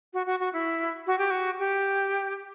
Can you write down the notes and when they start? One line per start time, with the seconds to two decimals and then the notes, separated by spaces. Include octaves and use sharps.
0.14 F#4
0.26 F#4
0.40 F#4
0.53 E4
1.07 F#4
1.18 G4
1.31 F#4
1.59 G4